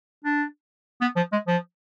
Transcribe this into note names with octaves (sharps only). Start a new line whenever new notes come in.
D4
B3
F3
G#3
F3